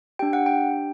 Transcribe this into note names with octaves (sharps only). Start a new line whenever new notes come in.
D4 G4 G5
F#5
G5